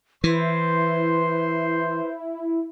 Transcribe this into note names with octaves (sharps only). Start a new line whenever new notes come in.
E3 E4 B4 C5 C6